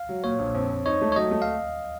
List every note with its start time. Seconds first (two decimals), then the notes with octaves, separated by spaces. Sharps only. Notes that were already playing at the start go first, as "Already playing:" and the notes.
Already playing: F5
0.09 F#3
0.24 A#2 C#5
0.39 A#1
0.55 F2
0.69 F2
0.86 D#4 C#5
1.01 A3
1.12 C#5
1.16 F#3 D#5
1.31 A3
1.42 F5